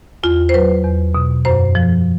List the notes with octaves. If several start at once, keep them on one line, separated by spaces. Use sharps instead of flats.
E2 F4
C5
F#3 B4
E2
B2
F#2 C5
F3